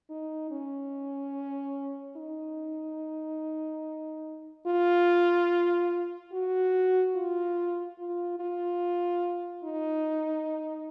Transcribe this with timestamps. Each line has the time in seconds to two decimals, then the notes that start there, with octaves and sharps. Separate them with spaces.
0.10 D#4
0.51 C#4
2.16 D#4
4.67 F4
6.33 F#4
7.15 F4
7.99 F4
8.40 F4
9.64 D#4